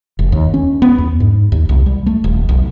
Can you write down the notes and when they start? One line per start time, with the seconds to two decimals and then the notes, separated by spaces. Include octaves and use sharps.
0.19 F1
0.32 D#2
0.54 C#4
0.82 B3
0.98 E2
1.20 G#2
1.52 D#2
1.69 C2
1.86 G3
2.06 A3
2.24 D#1
2.49 B1